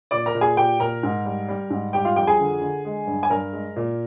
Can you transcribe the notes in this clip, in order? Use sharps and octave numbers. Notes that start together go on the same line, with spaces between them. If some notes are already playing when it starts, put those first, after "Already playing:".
A#2 D5 D6
A#4 A#5
A#2
G#4 G#5
A#2 G4 G5
A#2 A#4 A#5
G#2
G3
G3
G#2
G3 G4 G5
F4 F5
F2 G4 G5
G#4 G#5
D3
D3
G#3
G2
G#5
G2 A#4 A#5
G#3
A#2